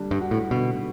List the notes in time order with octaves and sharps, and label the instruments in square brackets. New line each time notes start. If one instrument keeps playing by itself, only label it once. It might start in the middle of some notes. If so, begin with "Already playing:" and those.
Already playing: [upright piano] D3 G3 D4
[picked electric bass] G2
[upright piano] F#4
[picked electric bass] A2
[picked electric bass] B2 [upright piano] D3